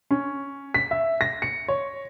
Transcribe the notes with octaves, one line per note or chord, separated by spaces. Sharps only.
C#4
B6
E5
A#6
C#7
C#5